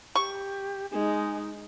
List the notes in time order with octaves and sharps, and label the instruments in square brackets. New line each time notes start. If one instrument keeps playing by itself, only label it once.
[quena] G4 [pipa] C#6
[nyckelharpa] G#3 [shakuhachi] D#4 [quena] G#5